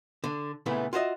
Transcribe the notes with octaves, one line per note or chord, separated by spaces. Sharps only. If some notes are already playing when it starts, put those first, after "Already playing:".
D3 D4
A#2 C#3 E3 A3 B3
F4 F#4 C5 D#5 E5